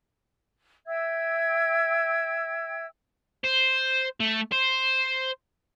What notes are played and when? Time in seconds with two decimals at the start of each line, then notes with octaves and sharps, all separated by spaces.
0.87 E5 G5 E6 G#6
3.44 C5
4.20 A3
4.52 C5